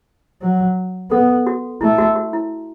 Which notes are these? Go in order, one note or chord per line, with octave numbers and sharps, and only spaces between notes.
F#3
B3 A4
F#4
A3 E4
F#4
F#4
E4